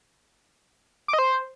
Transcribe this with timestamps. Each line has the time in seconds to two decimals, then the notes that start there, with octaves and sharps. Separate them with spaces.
1.08 D6
1.13 D#5
1.19 C5